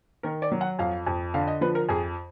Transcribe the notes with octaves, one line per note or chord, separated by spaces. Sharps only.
D#3 A#4
D5
F#3
F#5
F2 F5
F2
D3 F5
D#5
F3 B4
A#4
F2 G#4